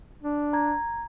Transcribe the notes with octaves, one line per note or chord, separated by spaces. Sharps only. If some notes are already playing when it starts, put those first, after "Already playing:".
D4
A#5 G#6